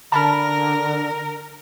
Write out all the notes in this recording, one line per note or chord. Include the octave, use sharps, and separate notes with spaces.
D3 A#4 A5 B5 F6